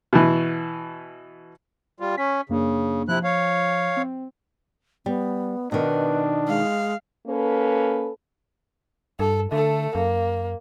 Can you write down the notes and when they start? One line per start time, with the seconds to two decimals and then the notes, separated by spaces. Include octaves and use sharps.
0.13 B2 E3
2.00 G3 F4
2.18 C#4 B6
2.49 F#2 C#3 A#3 D4
3.08 C3 F3 E4 F#6
3.24 C#5 F5
3.97 C4
5.06 G3 B3
5.72 B2 D#3 D4 B4
6.48 G#3 F5
7.27 A#3 C#4 A4 B4
9.19 G2 A4
9.52 D3 A3 A4
9.95 F#2 A#3